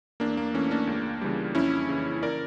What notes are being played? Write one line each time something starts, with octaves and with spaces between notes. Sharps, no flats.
E2 A#3 D4
A#3
E3 A3 C#4
A#3 D4
C#2
C#3 E3 G3
F2 C#4 E4
C#3 E3
A#4 D5